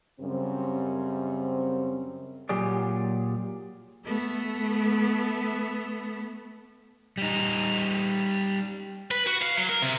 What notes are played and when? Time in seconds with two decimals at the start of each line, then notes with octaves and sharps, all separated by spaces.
0.21 F#2 C#3 G3 C4
2.49 A#2 F#3 G4 G#4 D5
4.06 A3 B3
7.18 G3 D#4
9.11 B4
9.27 F#4
9.42 F5
9.57 F#3
9.69 A#4
9.82 C3